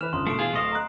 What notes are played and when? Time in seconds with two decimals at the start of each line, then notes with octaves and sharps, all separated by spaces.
0.01 E3 B4 F6 E7 F7
0.13 G1 C#3 C6 D#6
0.27 B2 A3 C7 D7
0.39 E3 F4 G#4
0.53 D1 A3 D#5 F5
0.72 A#5 F#6